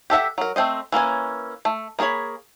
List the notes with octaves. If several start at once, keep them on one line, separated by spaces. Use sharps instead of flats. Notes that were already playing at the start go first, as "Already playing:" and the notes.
G4 A4 E5 F#5
F#3 A#4
A3 C4 C5 D#5
E3 A#3 C#4 G#5
A3
A#3 D#4 G#4 C#5 B5